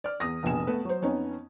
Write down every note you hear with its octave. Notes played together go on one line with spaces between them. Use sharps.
D5 F6
E2 D#6 A#6
F1 A#1 B2 G#5 E7
A3 B3 B4
F#3 C5
F2 B3 C#4 D#4